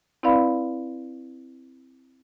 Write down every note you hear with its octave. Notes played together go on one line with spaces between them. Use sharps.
C4 E4 B4 D5 F5 B5